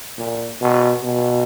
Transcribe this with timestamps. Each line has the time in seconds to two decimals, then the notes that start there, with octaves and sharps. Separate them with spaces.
0.18 A#2
0.61 B2
1.03 B2